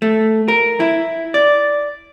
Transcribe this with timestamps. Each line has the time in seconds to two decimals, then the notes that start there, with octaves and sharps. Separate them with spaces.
0.02 A3
0.48 A#4
0.80 E4
1.34 D5